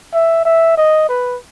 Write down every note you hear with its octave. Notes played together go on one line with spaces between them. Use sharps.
E5
E5
D#5
B4